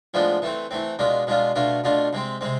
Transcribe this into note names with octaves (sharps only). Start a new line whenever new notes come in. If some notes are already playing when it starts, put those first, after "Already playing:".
A2 F3 G#3 B3 D4
E3 A3 C4
E3 A3 C4
B2 G#3 D4 F4
B2 G#3 D4 F4
B2 A3 D4 F4
B2 A3 D4 F4
C3 G#3 C4
C3 G#3 C4